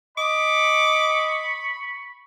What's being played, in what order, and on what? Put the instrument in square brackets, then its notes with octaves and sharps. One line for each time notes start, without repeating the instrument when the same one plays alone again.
[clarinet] D#5 [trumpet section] B5 C#6 [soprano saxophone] D6